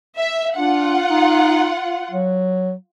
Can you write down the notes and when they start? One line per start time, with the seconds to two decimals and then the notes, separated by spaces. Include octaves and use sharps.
0.18 E5
0.57 D4 F4 F#5
1.10 D#4
2.11 F#3